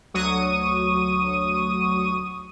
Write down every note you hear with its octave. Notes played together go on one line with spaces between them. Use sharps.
D2 F#3 C#6 D#6 D#7